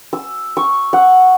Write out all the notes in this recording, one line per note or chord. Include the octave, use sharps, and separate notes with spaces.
E6
C#6
F#5